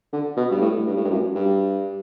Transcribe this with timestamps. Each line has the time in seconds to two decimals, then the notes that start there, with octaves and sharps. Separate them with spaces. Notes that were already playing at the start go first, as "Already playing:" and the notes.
0.13 D3
0.37 B2
0.51 G2
0.61 A2
0.86 G2
0.97 A2
1.04 G2
1.11 F#2
1.35 G2